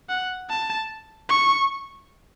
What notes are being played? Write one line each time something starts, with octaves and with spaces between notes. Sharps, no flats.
F#5
A5
C#6